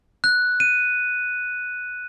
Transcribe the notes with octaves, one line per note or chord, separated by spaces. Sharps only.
F#6
D#7